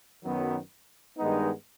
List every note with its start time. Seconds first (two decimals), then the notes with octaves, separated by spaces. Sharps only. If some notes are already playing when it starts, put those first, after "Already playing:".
0.22 F#2 D#3 F#3 B3
1.17 G2 D#3 G#3 B3 D#4